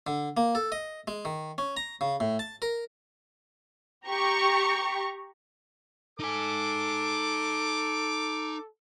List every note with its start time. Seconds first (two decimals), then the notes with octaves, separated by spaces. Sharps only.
0.07 D3
0.37 A#3
0.55 A4
0.72 D#5
1.08 G#3
1.25 D#3
1.58 C#4
1.77 A#5
2.01 C#3
2.20 A2
2.39 A5
2.62 A#4
4.08 G4 A#5 C#6
6.20 D#4 A4 G#5 D6